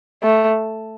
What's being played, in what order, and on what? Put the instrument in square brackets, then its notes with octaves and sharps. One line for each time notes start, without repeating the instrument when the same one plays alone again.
[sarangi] A3